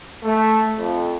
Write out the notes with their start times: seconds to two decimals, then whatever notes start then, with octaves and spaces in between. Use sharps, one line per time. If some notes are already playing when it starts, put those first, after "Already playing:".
0.24 A3
0.78 F2